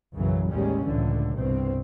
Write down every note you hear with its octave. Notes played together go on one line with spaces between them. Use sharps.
B1 F#2 C#3 E3 F#3
A1 D#2 G3 G#3 C#4
C#2 A2 D3 E3
C2 G2 B2 C4